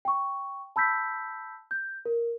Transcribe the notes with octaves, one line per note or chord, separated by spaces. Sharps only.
G5 C#6
A5 B5 E6 G6 B6
G6
A#4